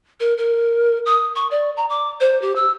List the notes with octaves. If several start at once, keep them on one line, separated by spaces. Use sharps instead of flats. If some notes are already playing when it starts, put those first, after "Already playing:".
A#4
A#4
D#6
C#6
D5
A#5
D6
C5
G4
E6